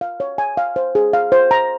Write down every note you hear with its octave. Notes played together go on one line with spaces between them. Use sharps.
F5
C#5
G#5
F5
C5
G#4
F5
C5
A#5